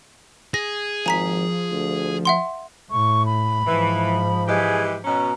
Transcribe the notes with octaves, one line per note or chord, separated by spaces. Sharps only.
G#4 A#6
G#1 F3 G#5 A#5 B6
D2
E5 F#5 C6
A2 C#6
B5
G#2 E3 F3
E3 G#3 G4 G#4
B2 C#4 A#5